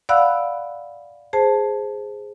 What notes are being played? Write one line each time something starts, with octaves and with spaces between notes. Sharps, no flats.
D5 F5 F#5 B5 E6 F#6
G#4 C5 A5